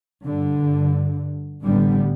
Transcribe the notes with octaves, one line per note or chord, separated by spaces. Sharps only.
G2 D3
A1 D3 G3 B3